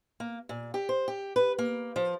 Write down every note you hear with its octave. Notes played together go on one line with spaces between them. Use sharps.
A#3
A#2
G4
C5
G4
B4
A#3
F3